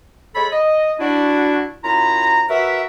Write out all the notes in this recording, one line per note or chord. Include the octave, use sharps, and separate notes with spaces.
G#3 A4 C#5 B5
D#5
D4 E4 F#4
F#2 E4 F4 A#5
F#4 A#4 B4 E5